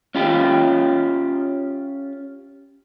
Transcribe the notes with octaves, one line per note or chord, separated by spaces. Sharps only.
C#4 F4 G4